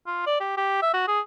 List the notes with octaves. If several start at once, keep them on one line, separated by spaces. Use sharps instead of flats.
F4
D5
G4
G4
E5
F#4
G#4